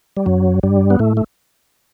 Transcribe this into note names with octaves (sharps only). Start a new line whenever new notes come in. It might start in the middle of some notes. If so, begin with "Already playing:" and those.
G3
F#2 F#3
G2 G3
B3
A2 A3
A3